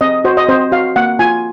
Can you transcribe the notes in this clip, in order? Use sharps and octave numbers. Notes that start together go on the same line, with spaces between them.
C4 D#5
F#4 C5
D#5
C4 C5
F#4 F5
A#3 F#5
F4 G#5